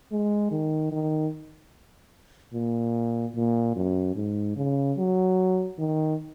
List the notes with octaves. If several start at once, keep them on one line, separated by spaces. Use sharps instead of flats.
G#3
D#3
D#3
A#2
A#2
F#2
G#2
C#3
F#3
D#3